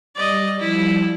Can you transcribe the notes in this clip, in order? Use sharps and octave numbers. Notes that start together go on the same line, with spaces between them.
G3 D5 D#5
F3 G3 E4